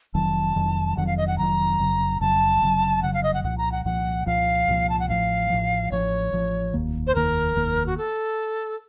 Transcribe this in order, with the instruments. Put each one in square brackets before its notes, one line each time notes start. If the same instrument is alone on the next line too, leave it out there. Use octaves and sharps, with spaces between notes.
[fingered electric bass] F1 F2 D#3 F#3 [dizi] A5
[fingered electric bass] F1 F2 D#3 F#3
[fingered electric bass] F1 F2 D#3 F#3 [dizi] F#5
[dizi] F5
D#5
F#5
[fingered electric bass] F1 F2 D#3 F#3 [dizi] A#5
[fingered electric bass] F1 F2 C#3 F#3
[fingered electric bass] F1 F2 C#3 F#3 [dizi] A5
[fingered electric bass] F1 F2 C#3 F#3
[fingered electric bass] F1 F2 C#3 F#3 [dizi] F#5
[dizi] F5
D#5
F#5
[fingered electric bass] C2 A#2 F3 [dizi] F#5
[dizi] A#5
F#5
[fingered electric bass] C2 A#2 F3 [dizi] F#5
[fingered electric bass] C2 A#2 F3 [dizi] F5
[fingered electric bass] C2 A#2 F3
[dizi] A5
F#5
[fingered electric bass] A1 A2 F3 [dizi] F5
[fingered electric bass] A1 A2 F3
[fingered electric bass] A1 A2 F3 [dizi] C#5
[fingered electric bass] A1 A2 F3
F1 D#2 D#3 A#3
[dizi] C5
[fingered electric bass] F1 D#2 D#3 A#3 [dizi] A#4
[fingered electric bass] F1 D#2 D#3 A#3
[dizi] F#4
A4